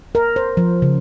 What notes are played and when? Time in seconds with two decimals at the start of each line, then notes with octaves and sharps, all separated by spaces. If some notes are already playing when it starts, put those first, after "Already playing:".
0.15 A#4
0.36 C5
0.57 F3
0.82 C#3